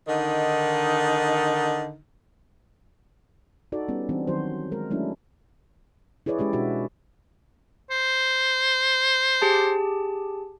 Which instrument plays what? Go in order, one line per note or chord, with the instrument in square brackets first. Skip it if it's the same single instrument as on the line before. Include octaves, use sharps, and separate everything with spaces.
[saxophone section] D3 D#3 D#4
[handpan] D#4 F#4 A4 D5
G3 B3 C#4
E3 G3 C4 D4
D#3 F#3 F#4 C5
G#3 A#4
F#3 G#3 A3 C#4 D4 E4
E4 G#4 B4 C#5 D5
G#3 C#4 G4 D5
B2 D4 F#4 E5
[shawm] C5
[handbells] G4 G#4 A5